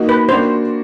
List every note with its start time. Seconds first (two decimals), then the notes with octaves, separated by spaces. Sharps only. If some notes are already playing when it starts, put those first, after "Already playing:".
Already playing: A#3 D#4 F#4
0.09 B4
0.29 A#3 D4 F#4 C5